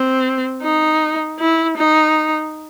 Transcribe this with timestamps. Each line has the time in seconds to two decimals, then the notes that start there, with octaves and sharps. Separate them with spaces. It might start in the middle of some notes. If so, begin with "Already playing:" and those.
Already playing: C4
0.63 D#4
1.39 E4
1.78 D#4